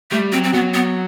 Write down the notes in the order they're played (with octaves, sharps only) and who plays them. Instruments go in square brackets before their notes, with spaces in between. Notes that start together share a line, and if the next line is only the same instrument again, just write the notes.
[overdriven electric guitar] G3 [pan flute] A3
[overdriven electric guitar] F#3 [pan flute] C4
[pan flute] C4
[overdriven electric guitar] F#3 [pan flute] B3
[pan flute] B3